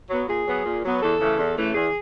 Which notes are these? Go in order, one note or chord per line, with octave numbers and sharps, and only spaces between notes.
F#3 B3
A#2 G#4
F#3 B3
A#2
F#3 B3
E2 A4
C#3 E3 A3
E2
C#3 E3 A3
E2 G#4